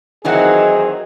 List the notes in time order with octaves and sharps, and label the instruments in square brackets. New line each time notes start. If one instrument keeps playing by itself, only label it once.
[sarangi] D#3 [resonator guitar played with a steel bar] E3 F#3 C4 [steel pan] D#4 F#5 [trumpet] G#4